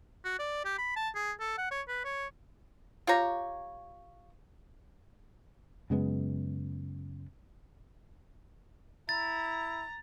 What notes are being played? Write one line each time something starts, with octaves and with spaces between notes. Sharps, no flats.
F#4
D5
G4
B5
A5
G#4
A4
F#5
C#5
B4
C#5
F4 G4 C#5 A#5
F#2 C#3 G#3 B3
E4 A#5 A6